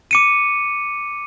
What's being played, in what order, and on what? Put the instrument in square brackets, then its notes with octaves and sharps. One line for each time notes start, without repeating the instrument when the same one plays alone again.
[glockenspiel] D6 C#7 D#7